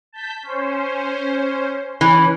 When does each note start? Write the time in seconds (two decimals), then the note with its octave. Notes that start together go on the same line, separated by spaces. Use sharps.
0.13 A5 G6 B6
0.43 C#4 C5
2.01 E3 C#4